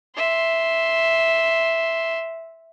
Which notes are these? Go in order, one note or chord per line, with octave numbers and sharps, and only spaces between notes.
E5 C6